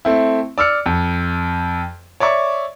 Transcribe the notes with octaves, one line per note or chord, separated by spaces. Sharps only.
A3 C4 E4
D5 E6 F6 C#7
F2
C#5 D5 E5 C#6